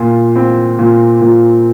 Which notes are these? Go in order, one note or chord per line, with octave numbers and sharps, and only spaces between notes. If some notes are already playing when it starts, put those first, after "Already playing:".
Already playing: A#2 F4
C4
A#2
A#2